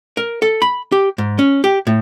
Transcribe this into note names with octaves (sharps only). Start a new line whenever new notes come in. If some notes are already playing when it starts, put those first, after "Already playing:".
A#4
A4
B5
G4
G#2
C#4
G4
A2